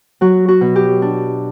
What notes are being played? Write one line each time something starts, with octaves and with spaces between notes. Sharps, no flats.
F#3 F#4
F#4
B2
G4
D4